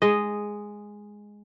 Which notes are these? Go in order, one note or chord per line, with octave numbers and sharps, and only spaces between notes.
G#3 D#5